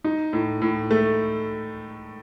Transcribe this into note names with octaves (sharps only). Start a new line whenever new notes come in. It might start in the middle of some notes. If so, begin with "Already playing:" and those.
D#4
A2
A2
A3